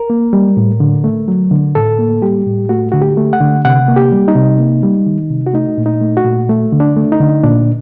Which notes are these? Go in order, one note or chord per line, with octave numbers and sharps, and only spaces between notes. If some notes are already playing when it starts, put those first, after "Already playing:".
Already playing: A#4
A#3
G3
A2
D3
A3
F#3
D3
A2 A4
A#3
G3 G4
A2
A3 F#4
D3 F#4
G4
A3
F#5
D3
C3 F#5
A#3
G4
G3
D#4
C3
A#3
G3
D#3
C3
F#4
A3 D#4
A#2
D#4
A3
F#4
A#2
A3
D3
D4
A3
D#4
D3
A#2 D4